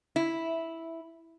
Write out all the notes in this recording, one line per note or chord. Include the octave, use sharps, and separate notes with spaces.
E4